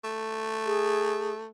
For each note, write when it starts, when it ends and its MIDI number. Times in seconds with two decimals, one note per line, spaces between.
0.04 1.46 57
0.65 1.32 68